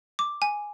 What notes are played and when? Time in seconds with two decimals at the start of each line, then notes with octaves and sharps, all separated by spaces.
0.19 D6
0.42 G#5